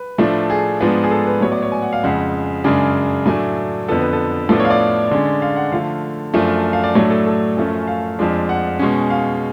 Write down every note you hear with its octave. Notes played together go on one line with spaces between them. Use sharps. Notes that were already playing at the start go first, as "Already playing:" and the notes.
Already playing: B4
A2 F3 A3 D4
G#4
G#2 F3 B3 D4
G#4
A4
B4
A2 F#3 B3 C#5
D5
C#5
G#5
F#5
F5
F2 C#3 G#3 F#5
F#2 C#3 G#3 D4
A2 F#3 A3 D4 G#5
F2 D3 F3 B3 A4
B4
A4
A2 F3 B3 D4 A4
C#5
F5
D5
D3 G#3 C#4
F5
F#5
D3 F3 A3 F5
F#2 F3 A3 D4
F5
D5
A2 F#3 A3 D4 C#5
A4
A4
F#2 F3 A3 C#4
F5
F2 F3 G#3 D4
F#5
B2 G#3 C#4
F5